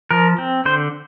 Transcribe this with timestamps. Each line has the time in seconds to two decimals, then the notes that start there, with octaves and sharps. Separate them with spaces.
0.11 F3 A#4
0.38 C4
0.65 D3 C5